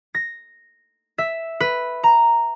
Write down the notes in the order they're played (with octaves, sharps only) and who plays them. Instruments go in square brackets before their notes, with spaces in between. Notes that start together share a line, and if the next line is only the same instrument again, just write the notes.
[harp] A#6
E5
B4
A#5